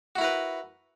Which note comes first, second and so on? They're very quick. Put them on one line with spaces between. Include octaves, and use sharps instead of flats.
F#4 E4 A#4 B4